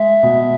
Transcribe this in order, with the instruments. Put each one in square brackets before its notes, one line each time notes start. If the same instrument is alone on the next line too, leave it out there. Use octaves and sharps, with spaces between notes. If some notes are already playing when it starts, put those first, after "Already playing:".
Already playing: [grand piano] G#3 [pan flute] E5
[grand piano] B2